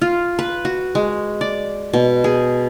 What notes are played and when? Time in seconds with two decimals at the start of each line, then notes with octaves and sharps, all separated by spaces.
0.01 F4
0.39 B4
0.65 F#4
0.95 G#3
1.41 D5
1.93 B2
2.24 G#4